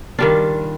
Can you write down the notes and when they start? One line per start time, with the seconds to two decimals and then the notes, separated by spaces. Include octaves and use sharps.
0.19 D#3 G3 D4 F4